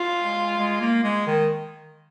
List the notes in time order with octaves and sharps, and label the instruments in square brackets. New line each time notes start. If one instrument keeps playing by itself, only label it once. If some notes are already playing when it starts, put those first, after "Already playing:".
Already playing: [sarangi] F4
[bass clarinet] G#3
G#3
A#3
G#3
D#3